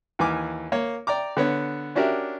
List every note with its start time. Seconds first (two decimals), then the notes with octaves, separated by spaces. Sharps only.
0.19 D#2 E3 G#5 D6 F6
0.72 A#3 C#5
1.07 D5 G5 A#5 D6
1.37 D3 B3 C#5
1.95 C#4 D4 F#4 G4 A#4 E5